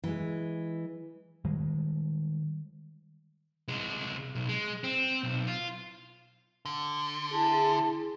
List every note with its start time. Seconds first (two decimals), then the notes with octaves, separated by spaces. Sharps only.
0.04 E3 G#3
1.45 D#3 G3 G#3
3.68 C2 G#3
4.35 B1
4.49 G#3
4.84 C4
5.24 B1
5.47 F4
6.65 D3
7.33 E4 G#4 A5